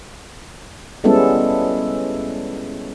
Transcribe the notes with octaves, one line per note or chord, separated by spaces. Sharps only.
G3 G#3 B3 C#4 E4 A4